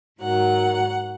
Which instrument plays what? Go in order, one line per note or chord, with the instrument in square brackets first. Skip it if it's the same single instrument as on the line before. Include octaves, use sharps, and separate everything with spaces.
[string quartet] G#2 D#3 F#3 F#5